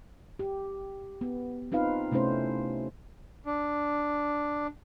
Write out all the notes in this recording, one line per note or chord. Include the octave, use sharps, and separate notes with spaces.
G4
B3
C4 D#4 F4 B4 F5
C3 A3 C#4 E4 C5
D4